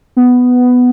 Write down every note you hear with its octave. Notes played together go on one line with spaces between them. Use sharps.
B3